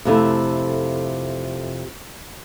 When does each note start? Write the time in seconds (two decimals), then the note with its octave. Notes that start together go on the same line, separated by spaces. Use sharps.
0.05 F2 C3 A3 E4